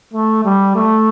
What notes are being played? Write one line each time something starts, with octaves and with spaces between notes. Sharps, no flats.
A3
G3
A3